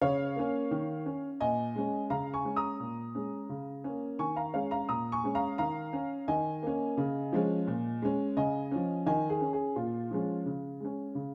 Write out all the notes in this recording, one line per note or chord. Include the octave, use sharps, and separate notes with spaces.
C#3 C#5 F5
A#3 C#4
D#3
C#4
A#2 D#5 G#5
G#3 C#4
C#3 F5 A#5
G#5 C#6
G#3 C#4
A#5 D#6
A#2
G#3 C#4
C#3
A#3 C#4
D#3 G#5 C#6
F5 A#5
G#3 C#4 C#5 F5
F5 A#5
A#2 A#5 D#6
G#5 C#6
G#3 C#4
F5 A#5
D#3 F5 A#5
C#4
D#3 D#5 G#5
A#3 C#4
C#3
F3 G#3 C#4
A#2
G#3 C#4
C#3 D#5 G#5
F3 C#4
D#3 D#5 G#5
G#4
C#4
G#4
A#2 F4
F3 G#3 C#4
C#3
G#3 C#4
C#3